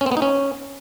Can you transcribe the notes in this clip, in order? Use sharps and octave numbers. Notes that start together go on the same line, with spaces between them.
C#4
C4
B3
D#4
C#4